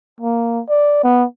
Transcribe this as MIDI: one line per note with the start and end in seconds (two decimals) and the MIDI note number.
0.20 0.61 58
0.69 1.01 74
1.04 1.24 59